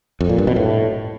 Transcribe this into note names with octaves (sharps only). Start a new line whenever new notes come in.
F2
A#2
G2
B2
A2